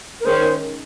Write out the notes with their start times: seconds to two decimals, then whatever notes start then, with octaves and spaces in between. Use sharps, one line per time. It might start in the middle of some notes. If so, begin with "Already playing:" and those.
0.20 A#4
0.25 D#3 G#3 C#4 C5